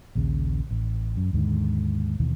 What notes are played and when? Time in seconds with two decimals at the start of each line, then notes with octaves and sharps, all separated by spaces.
0.15 A#1 D#2 C#3
0.71 A1
1.17 F#2
1.33 D#2 G#2 D3
2.20 D#2 B2 D#3 E3